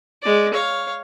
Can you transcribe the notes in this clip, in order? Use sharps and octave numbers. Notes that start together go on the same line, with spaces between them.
G#3 D5
C#5 F5